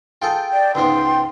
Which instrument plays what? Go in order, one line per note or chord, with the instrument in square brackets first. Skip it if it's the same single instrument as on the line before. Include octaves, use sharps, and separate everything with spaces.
[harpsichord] F4 G#4 A4 [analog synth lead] G5
[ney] D5
[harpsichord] C#2 G#2 B3 [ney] C6